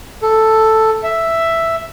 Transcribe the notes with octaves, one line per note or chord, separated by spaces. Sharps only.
A4
E5